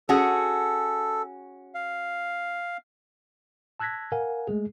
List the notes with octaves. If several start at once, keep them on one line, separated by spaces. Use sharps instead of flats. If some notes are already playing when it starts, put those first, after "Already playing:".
C#4 F#4 G#4 A4
F5
A5 E6 F#6 G#6 A#6 B6
A#4 F5 F#5 G#5
G#3 A3 G#4